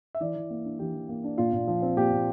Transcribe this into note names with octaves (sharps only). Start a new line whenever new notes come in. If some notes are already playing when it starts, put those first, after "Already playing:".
E5
E3 D5
E3
A#3
D4
E3 G4
E3
A#3
D4
A#2 F4
A#2
F3
C4
A#2 G4
A#2